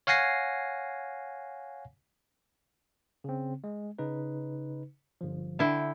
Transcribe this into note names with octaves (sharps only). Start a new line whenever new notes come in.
C#5 F5 F#5 G#5 A#6 C7
C#3 C4
G#3
C#3 D#4 B4
G1 F3
D3 E4 E5 G5